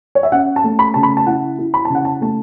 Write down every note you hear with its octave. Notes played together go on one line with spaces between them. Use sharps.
C#5
E5
C#4 F#5
A5
A3
B5
C#3 A5
B5
A5
E4 F#5
E4
B5
C#3 A5
F#5
A5
A3 A5